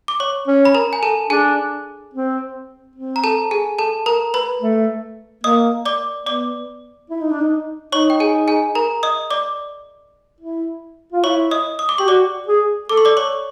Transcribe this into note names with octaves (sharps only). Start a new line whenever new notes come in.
D6
C#5 C#6
C#4
B5
A#4 A#5
G#5
A4 A5
D4 G#4 G#5
C4
C4
A#5
A4 A5
G#4 G#5
A4 A5
A#4 A#5
B4 B5
A3
A#3 D#5 D#6
D5 D6
B3 D5 D6
E4
D#4
D4
D#4
D#4 C#5 C#6
G5
G#4 G#5
G#4 G#5
A#4 A#5
D#5 D#6
D5 D6
E4
F4
E4 C#5 C#6
D#5 D#6
D#6
D6
G4 C#6
F#4 D5 D6
G#4
A4 D6
C#6
D5 D6
C#5 C#6